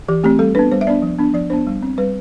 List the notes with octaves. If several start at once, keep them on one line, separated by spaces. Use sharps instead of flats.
E3 G4
A3 C4 G4
G3 A4
B3 D4 B4
G3 C5
E5
B3 D4 D5
F3
B3 D4
F3 D5
B3 D4 C5
G3
C4
G3 B4